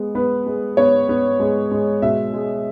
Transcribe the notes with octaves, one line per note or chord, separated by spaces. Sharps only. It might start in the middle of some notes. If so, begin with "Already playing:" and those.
Already playing: G#3 B3
B3 B4
G#3
B3 C#5
B3
G#3
G#3
B2 E5
G#3